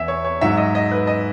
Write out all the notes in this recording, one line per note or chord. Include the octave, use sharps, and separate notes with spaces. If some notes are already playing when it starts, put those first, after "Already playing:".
Already playing: E2 E5
C#5
C#5
G#2 F#3 E5
D#5
D#5
B4
D#5